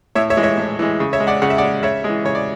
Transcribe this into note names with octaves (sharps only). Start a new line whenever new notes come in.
A2 C#5 E5
C#5 E5
E3 G#3
C#5 E5
A2
E3 G#3
C#3
C#5 E5
G#3
D5 F#5
C#3 F#5
E5
D5 F#5
G#3
C#3 C#5 E5
G#3
E3
C#3 C#5
D5